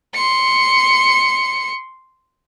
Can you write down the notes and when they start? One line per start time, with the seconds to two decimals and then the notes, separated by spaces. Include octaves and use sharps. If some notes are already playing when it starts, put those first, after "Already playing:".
0.14 C6 C#7